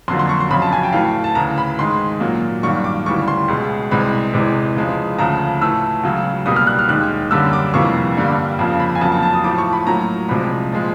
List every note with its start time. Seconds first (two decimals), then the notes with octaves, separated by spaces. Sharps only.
0.08 F2 D3 F#3 A#3 C6
0.19 C6
0.29 C#6
0.40 C6
0.51 F2 C#3 F#3 B5
0.62 A5
0.73 G#5
0.83 G5
0.93 A2 E3 A3 F5
1.24 A5
1.35 D2 C#3 E3 A#5
1.58 B5
1.79 G#2 D#3 G#3 C6
2.20 A#2 F#3 A#3
2.63 G2 D#3 F#3 A#3 C#6
2.84 D6
3.06 D2 C#3 E3 G3 C#6
3.28 C6
3.48 C#2 B2 G#3
3.91 C2 C3 E3 G#3 B5
4.33 E2 C3 E3 G#3
4.76 E2 C#3 F3 G#3
5.18 D2 C#3 F3 A3 A#5
5.61 A2 E3 A3 E6
6.03 C#2 C#3 F#3
6.46 C2 B2 G3 A#3 D#6
6.56 F6
6.67 F#6
6.79 F6
6.88 D#2 D#3 G#3 F#6
7.31 F#2 D3 G3 A#3 E6
7.53 D6
7.74 F2 C3 E3 G3 A#3 C#6
8.17 G2 D3 G3 A#3
8.59 F2 C#3 F3 A#3
8.80 B5
8.95 G#5
9.01 F2 C#3 F#3 A#3 A5
9.12 A5
9.23 A5
9.33 D#6
9.44 A2 F3 A3 D6
9.58 C#6
9.73 B5
9.86 A2 F#3 A#3 A#5
10.29 C2 C3 F3 G#3 B5
10.72 A#2 F3 G#3